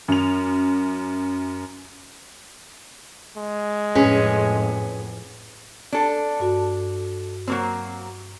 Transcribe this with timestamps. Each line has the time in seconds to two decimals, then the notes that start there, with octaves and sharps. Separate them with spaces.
0.08 F#2 F7
3.37 G#3
3.95 F2 A2 C#4 G#4 B4 G#5
5.92 D4 A4
6.40 G2 F#4
7.47 F#3 A#3 C4